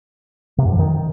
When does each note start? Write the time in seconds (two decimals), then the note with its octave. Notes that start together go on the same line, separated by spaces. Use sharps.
0.58 C3
0.65 F#2
0.72 F3
0.79 D#3